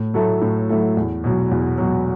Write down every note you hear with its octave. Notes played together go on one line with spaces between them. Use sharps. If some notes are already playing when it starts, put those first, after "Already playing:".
Already playing: A2
F#3 A3 E4 A4
A2
F#3 A3 E4 A4
E2
B2 F#3
E2
B2 F#3